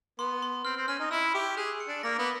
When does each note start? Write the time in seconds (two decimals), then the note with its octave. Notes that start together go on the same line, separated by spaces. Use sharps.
0.19 B3 C6
0.42 C6
0.65 C4 F6
0.77 C4
0.88 C#4 F6
1.00 D#4
1.11 E4 E6
1.34 G4 C#6
1.57 G#4 F#6
1.80 C#7
1.88 D4
2.03 A#3 A#6
2.19 B3